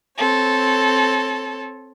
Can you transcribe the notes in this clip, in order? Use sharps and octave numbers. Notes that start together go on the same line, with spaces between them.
C4 A4 C#5